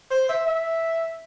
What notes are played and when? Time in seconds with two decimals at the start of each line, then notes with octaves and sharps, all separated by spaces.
0.11 C5
0.29 E5
0.47 E5